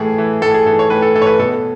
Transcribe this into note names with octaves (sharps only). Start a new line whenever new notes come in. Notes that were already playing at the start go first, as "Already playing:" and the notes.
Already playing: A2 E3 G#4 A4
E3
A2 A4
G#4
E3 A4
C#5
A2 B4
A4
E3 A4
C#5
B4
B2 A4